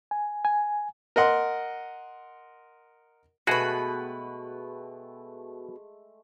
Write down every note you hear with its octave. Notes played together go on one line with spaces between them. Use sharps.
G#5
G#5
A#4 D#5 F#5 C6
B2 G#3 A3 F#4 G#4 B4 G5